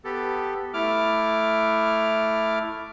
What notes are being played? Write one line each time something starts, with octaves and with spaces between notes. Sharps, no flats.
B3 G4 A4
A3 E4 D6 F6